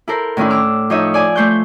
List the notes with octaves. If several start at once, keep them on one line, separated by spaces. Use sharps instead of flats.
E4 A4 A#4 C5
A2 D#3 C#4 D4 E4
D6 E6 F6
F3 D#4 C#5 D#5 E5
D5 G#5 D6
A3 C5 C#6 G6